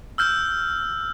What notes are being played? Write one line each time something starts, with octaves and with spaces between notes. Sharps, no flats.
E6 F6 G6